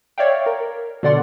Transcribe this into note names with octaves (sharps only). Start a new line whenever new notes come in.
C#5 D5 E5 F5 G5
A#4
B2 D3 D5 F#5 C6